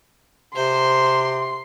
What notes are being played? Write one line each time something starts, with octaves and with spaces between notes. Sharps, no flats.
C3 C5 C6